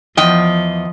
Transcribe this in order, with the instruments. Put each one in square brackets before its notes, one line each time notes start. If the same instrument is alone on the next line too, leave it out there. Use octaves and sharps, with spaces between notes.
[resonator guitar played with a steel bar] E2 G5 [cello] F3 [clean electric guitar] D#5